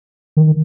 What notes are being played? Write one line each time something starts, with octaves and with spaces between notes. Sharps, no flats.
D#3